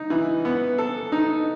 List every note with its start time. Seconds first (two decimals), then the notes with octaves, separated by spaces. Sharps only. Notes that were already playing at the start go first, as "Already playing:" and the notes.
Already playing: D#4
0.10 E3
0.45 B3
0.78 A4
1.12 D#4